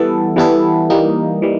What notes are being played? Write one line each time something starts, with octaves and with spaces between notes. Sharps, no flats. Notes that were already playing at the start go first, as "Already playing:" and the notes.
Already playing: E3 G3 B3 E4 A4
E3 G3 B3 E4 A4
E3 G3 A#3 D#4
E3 G3